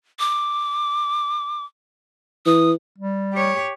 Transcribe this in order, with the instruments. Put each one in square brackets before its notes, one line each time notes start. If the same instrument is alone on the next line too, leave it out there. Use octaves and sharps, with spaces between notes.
[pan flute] D6
[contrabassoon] E3 [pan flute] D#6
[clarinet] G3
[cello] G4 C#5